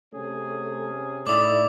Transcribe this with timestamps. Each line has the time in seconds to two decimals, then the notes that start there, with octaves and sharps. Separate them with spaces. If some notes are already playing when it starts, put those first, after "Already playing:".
0.13 C3 A3 C#4 G#4
1.27 A2 A3 D#4 E4 D5 D6 D#6